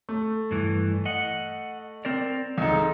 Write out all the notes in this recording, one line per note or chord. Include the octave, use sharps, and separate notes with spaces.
A3
G2 E3
D#5 F#5
C4 A#4 D5
C#2 E3 D#4 A4